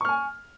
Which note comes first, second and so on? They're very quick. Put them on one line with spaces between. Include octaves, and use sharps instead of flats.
C#6 F6 G#5